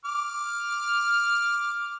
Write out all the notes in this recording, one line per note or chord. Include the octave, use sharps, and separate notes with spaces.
D6 F6